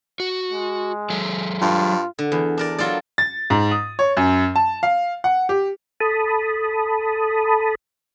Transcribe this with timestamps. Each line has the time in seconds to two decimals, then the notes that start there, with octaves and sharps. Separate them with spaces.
0.20 F#4
0.52 G#3
1.10 F#3 G#4 A4
1.61 G2 F4
2.19 D3
2.32 E2
2.58 D4 A#4 D5
2.78 F#3 F4 A4 D5
3.18 A6
3.50 G#2
3.71 D#6
3.99 C#5
4.17 F#2
4.56 A5
4.83 F5
5.24 F#5
5.49 G4
6.00 A4 A5 B5 D#6